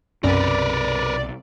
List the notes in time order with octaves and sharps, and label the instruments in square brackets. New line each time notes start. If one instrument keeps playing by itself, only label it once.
[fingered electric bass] B1 C3 [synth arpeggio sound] F#2 [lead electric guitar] A#4 B4 [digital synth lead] D5